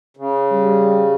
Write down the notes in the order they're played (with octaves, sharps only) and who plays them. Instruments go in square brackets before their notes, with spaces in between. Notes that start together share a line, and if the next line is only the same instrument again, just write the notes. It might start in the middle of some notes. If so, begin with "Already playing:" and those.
[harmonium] C#3
[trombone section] G3